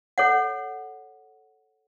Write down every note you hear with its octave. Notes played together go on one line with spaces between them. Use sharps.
A4 C#5 F#5